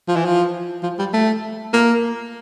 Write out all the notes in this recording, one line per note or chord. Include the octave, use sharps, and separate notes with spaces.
F3
E3
F3
F3
G3
A3
A#3